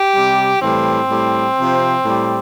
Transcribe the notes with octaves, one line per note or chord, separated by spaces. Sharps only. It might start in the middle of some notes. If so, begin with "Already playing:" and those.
Already playing: G4
C3 G3
A2 E3 G3 C4
A2 G3
C3 F3
A2 G3